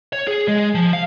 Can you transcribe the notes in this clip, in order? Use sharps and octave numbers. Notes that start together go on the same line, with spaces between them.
C#5
G#4
G#3
F3
F5